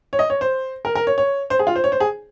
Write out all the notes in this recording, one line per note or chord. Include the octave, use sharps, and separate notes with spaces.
C#5
D#5
C#5
C5
A#4
A#4
C#5
C#5
C5
G#4
F4
C5
C#5
C5
G#4